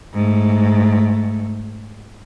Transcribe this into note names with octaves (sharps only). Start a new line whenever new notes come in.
G#2 A3